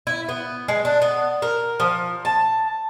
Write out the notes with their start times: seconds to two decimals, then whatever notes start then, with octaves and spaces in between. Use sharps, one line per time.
0.07 E4
0.29 B3
0.68 G#3
0.85 D4
1.02 B3
1.42 A#4
1.80 F3
2.25 A5